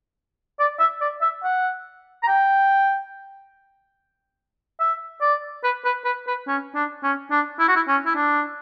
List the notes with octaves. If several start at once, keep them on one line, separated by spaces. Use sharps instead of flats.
D5
E5
D5
E5
F#5
A#5
G5
E5
D5
B4
B4
B4
B4
C#4
D4
C#4
D4
E4
F#4
E4
C#4
E4
D4